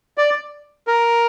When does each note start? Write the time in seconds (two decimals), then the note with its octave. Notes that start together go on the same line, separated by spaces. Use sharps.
0.18 D5
0.88 A#4